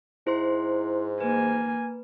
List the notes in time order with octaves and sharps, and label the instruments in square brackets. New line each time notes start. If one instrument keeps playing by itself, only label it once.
[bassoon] G#2 [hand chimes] E4 C5 C6
[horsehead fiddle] A#3 G#5 [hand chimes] B4